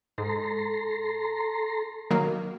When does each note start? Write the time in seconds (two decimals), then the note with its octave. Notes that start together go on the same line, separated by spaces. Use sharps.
0.18 G#2 A4 A#5 C6
2.10 D#3 F#3 A#3